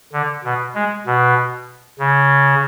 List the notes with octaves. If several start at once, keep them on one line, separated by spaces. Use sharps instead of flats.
D3
B2
G#3
B2
C#3